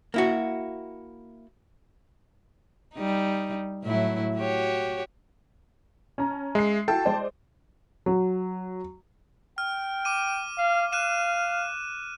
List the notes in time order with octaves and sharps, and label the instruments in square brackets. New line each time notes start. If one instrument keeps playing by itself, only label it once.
[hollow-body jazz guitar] A#3 E4 F#4
[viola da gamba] G3 D#4
A2 F#3 E4
F#4 G4 C#5
[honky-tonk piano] C#4 A5 A#5
[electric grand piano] G#3 [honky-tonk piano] E5 C7
[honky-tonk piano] E4 F#4 A4 [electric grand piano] G5 A5
[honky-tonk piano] G#3 C5 D5
[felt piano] F#3
[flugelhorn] G5 [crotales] F6
[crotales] D6 D#7
[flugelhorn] F5
[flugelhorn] F5 [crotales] F#6 D#7 E7